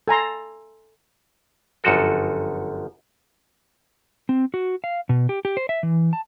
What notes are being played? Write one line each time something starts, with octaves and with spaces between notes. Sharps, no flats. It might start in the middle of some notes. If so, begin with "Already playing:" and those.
A4 G#5 A#5 C6
G1 F#2 F3 F#4 A4
C4
F#4
F5
B2
G4
G4
C5
E5
E3
A5